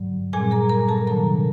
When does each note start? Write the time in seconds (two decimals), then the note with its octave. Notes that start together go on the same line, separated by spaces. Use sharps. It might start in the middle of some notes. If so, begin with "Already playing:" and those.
Already playing: G2 D3 F#3
0.33 A#2 G3 C4 G#4 G#5
0.51 A#4 A#5
0.69 A#4 A#5
0.88 A4 A5
1.07 C3 D#3 F#3 A#3 D4 A#4 A#5